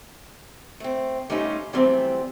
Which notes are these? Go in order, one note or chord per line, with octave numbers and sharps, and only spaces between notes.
A3 C4
G3 A3 C#4 D#4 F4
E3 F#3 G3 A3 B3 C4